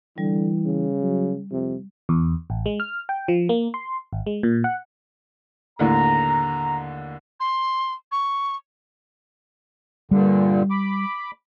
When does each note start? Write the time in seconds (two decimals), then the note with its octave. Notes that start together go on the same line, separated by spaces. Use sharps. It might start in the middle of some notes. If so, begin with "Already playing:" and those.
0.18 D3 E3 G3
0.65 C#3
1.02 F#3
1.51 F2 C3
2.09 E2
2.50 A1
2.66 G#3
2.80 F6
3.09 G5
3.28 F3
3.49 A#3
3.74 C6
4.13 G#1
4.26 G#3
4.43 A#2
4.64 F#5
5.79 D#2 A2 D3 A#5
7.40 C6
8.12 C#6
10.11 G2 A#2 D3 G3
10.70 B5 D6